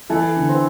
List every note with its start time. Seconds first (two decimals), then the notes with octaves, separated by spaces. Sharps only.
0.10 E3 A4
0.37 D3
0.49 C4